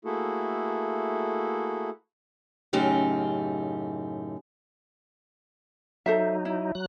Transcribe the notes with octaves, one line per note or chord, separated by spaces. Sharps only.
A3 A#3 E4 F#4 G#4 A4
F#2 A2 C#3 D#4 G4
F#3 D#4 A4 C5 E5
E4
F#3 F#6